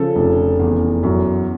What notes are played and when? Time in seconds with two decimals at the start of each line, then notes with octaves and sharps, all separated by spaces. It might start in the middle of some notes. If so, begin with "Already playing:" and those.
Already playing: C#3 F3 A4
0.16 F1
0.60 E2
1.03 F#2